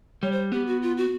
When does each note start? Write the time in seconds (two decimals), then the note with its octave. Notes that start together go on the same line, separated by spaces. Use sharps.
0.23 G3 C#5
0.32 C5
0.52 B3 G4
0.67 F#4
0.82 F4
0.97 F#4